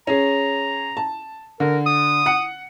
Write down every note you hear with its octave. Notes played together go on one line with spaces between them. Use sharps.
C#4 G#4 A#5
A5
D3 A#4
D#6
F#5 C#7